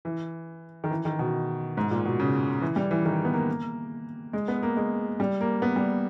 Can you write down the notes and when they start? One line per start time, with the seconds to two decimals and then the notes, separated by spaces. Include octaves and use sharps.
0.05 E3
0.84 D#3
0.91 E3
1.05 D#3
1.19 B2
1.77 G#2
1.91 A#2
2.05 B2
2.20 C#3
2.62 E3
2.76 G3
2.91 E3
3.05 D#3
3.25 B3
3.33 A#3
4.33 G#3
4.48 B3
4.63 A#3
4.77 G#3
5.20 G3
5.41 A#3
5.62 B3
5.76 G3